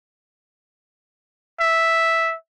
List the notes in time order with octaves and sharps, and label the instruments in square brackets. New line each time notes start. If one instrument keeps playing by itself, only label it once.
[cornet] E5